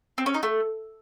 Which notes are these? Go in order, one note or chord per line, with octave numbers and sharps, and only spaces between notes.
C4
C#4
D#4
A3